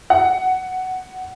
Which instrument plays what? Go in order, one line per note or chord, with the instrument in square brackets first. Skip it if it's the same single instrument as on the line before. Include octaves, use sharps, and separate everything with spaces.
[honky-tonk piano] F#5